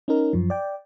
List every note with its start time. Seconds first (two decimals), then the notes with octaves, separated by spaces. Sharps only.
0.08 C#4 D#4 A#4
0.33 F#2 F3
0.50 D5 G5